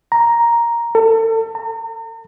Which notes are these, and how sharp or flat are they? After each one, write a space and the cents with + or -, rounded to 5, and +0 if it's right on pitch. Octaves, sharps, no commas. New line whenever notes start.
A#5 +5
A4 +35
A#5 -40